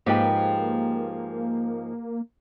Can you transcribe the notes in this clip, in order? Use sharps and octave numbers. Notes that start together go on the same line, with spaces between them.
G#2 F3 G#3 A#3 G4 B4 G5